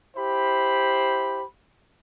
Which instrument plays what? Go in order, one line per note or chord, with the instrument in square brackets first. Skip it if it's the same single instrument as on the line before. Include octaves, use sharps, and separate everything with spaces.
[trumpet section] E4 G4 C5 B5